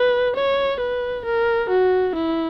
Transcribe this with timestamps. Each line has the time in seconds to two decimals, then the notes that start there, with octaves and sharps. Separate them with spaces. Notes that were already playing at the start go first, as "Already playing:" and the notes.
Already playing: B4
0.36 C#5
0.81 B4
1.25 A#4
1.69 F#4
2.15 E4